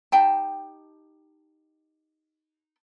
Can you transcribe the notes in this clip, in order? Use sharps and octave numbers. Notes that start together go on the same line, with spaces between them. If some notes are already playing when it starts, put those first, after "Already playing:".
D#4 G4 G5 A5